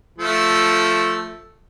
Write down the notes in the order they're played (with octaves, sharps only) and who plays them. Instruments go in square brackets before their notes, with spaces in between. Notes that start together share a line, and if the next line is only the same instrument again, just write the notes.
[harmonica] F3 A3 A4